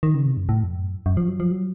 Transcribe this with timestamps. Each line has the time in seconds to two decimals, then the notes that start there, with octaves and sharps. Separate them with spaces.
0.03 D#3
0.14 C#3
0.26 C3
0.37 F#2
0.49 A2
0.64 F2
0.79 F#2
1.06 F#2
1.17 F3
1.28 F#3
1.40 F3
1.51 F#3